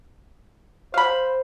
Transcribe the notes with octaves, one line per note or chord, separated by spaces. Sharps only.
C5 F5 B5